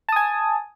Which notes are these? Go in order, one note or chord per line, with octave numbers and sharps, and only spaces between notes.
G#5 A5 D#6